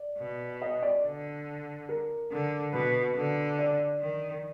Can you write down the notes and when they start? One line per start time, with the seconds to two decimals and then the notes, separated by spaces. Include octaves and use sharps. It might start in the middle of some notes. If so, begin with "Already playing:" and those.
Already playing: D5
0.18 B2
0.61 D#5
0.82 D5
1.03 D3
1.89 A#4
2.31 D3
2.73 B2 B4
3.15 D3
3.59 D5
4.01 D#3